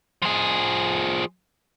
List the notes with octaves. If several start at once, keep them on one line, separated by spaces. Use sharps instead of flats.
F3 G#4